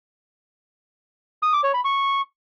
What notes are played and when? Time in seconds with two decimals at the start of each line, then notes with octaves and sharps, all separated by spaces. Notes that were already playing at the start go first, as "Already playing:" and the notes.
1.43 D#6
1.53 D6
1.64 C#5
1.74 B5
1.84 C#6